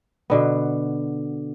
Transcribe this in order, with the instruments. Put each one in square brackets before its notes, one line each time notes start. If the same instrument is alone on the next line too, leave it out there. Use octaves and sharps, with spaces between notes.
[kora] B2 D3 B3